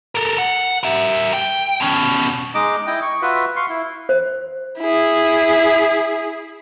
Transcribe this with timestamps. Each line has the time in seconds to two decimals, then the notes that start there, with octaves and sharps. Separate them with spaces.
0.15 A4 A#4
0.38 F#5
0.83 A#4 E5
1.33 G5
1.80 B2 C#4
2.55 G#3 D#4 D#5 D6
2.87 E4 D#5 G5
3.02 C#6
3.22 F4 F#4 B4 E5
3.56 F5 C6 C#6
3.69 E4
4.09 C5
4.79 E4 G#4